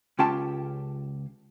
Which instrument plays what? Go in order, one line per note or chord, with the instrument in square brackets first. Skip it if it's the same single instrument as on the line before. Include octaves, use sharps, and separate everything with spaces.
[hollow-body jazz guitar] C#2 C#4 F4 G4 G5 A5